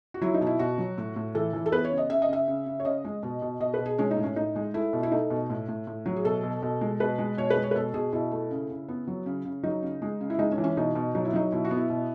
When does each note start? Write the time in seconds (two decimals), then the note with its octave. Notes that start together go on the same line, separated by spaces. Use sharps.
0.14 F#4
0.21 F#3 E4
0.34 D#4
0.41 B2
0.47 E4
0.59 B2 F#4
0.78 F#3
0.98 A2
1.16 A2
1.35 E3 A4
1.53 E3
1.66 A4
1.72 B3 B4
1.85 C#5
1.91 C#3
1.97 D#5
2.10 C#3 E5
2.22 D#5
2.29 C#3 E5
2.48 C#3
2.66 C#3
2.80 C#5
2.85 C#3 D#5
3.04 G#3
3.23 B2
3.42 B2
3.60 B2 D#5
3.74 B4
3.79 B2
3.86 G#4
3.98 G#3 C#4
4.11 D#4
4.17 A2
4.23 C#4
4.36 A2 D#4
4.56 G#3
4.74 A3 E4
4.93 B2
5.03 E4
5.12 A3 D#4
5.30 B2
5.50 A2
5.68 A2
5.87 A2
6.06 F#3
6.16 G#4
6.24 B2 A4
6.43 B2
6.62 B2
6.81 G#3
7.00 B2 B4
7.18 G#3
7.38 B2 C#5
7.50 B4
7.57 G#3
7.63 C#5
7.71 B4
7.76 B2 A4
7.94 B2 G#4
8.13 B2 E4
8.31 A3
8.51 C#3
8.70 C#3
8.89 B3
9.07 F#3
9.26 C#3
9.45 C#3
9.63 F#3 D#4
9.83 C#3
10.02 G#3
10.21 C#3
10.30 E4
10.39 G#3 D#4
10.52 C#4
10.58 E3
10.64 C#4
10.77 B2 D#4
10.95 B2
11.15 F#3 D#4
11.25 E4
11.33 F#3 D#4
11.52 B2 E4
11.65 F#4
11.71 B3
11.77 E4
11.90 B2